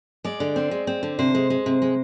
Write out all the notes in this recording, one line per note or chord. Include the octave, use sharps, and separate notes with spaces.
G#3 D5
D3
C4
G#3
C4
D3
C3 C5
G#3
G#3
C3
G#3